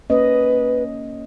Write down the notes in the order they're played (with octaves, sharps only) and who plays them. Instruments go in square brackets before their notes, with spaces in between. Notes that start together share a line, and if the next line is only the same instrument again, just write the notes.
[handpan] A#3 C#4 D#5 [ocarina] B4